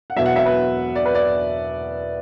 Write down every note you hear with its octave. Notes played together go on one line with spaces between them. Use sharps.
F#5
E1 E2 B2 F#3 E5
F#5
E5
B4
D5
B4
D5